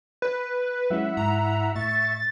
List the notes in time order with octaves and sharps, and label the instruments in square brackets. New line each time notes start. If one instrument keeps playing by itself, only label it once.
[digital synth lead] B4
[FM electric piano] F#3 G#3 C#4 [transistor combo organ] E4 E5 F#5
[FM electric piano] G#2 [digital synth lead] A#5
[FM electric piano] A2 [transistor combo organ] E5 C#6 [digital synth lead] A6